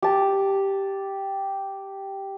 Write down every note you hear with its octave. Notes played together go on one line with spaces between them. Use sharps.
G4 A5